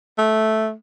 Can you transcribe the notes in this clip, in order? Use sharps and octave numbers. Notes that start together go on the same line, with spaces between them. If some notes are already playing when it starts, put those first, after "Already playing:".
A3